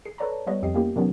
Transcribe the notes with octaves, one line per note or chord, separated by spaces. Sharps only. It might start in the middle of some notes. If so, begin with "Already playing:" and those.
G#4 C7
A4 B4 C#5 D5 A5 A#5
G3 B3 B4 C#5 D#5
F2 G4 D#5 C7
A#3 B3 C#4 E4 G4
C3 D#3 F#3 B3 C#4